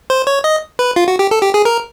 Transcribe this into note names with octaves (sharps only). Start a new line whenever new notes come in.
C5
C#5
D#5
B4
F4
F#4
G4
A4
G4
G#4
A#4